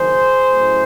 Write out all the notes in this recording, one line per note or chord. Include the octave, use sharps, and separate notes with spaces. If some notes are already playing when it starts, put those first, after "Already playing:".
Already playing: F#1 F#2 D#3 G#4 C5
A2 F#3 A3 C#4 E4